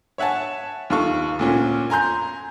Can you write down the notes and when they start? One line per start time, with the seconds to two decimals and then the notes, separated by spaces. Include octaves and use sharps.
0.18 C#5 E5 F#5 G#5 A5
0.90 D#2 F4 A4 C#6
1.39 D2 A#2 C#4
1.90 G#5 A#5 C6 G6